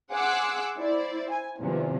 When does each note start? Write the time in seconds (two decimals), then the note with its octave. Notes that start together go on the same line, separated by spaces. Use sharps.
0.12 G#4 F#5 C6 D6 E6 F#6
0.77 E4 C5 D5
1.31 G#5
1.60 E2 C3 D#3 F3